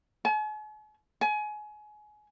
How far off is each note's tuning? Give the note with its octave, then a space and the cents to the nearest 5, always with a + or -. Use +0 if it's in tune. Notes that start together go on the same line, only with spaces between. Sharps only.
G#5 +45
G#5 +25